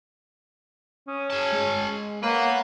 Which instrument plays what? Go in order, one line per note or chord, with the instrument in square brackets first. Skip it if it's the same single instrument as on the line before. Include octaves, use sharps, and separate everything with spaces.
[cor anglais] C#4 [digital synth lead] D#6
[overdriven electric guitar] G#4 A5 [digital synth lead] G#6
[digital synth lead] G#3
[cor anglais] A#3 [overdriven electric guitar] B4 F#5 [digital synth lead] C#5